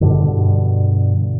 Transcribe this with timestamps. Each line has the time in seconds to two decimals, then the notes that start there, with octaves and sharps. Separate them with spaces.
0.01 G2 B2 D3